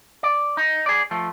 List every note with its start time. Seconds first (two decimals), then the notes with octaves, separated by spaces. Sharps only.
0.23 D5
0.57 D#4
0.86 G#4 D5
1.11 F3 A3